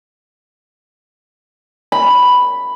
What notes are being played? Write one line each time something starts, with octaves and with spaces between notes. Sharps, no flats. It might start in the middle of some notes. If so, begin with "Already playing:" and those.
B5